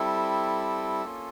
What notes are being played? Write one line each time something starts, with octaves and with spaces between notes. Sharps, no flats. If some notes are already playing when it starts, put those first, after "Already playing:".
Already playing: G3 C4 E4 A4
A#3 C#4 F4